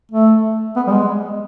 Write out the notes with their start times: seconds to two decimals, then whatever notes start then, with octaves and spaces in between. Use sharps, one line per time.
0.12 A3
0.76 B3
0.87 G3
0.92 G#3